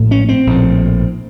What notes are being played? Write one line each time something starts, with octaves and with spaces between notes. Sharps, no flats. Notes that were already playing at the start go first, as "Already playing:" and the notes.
Already playing: A#1 A2
C#4
C4
A#1 A2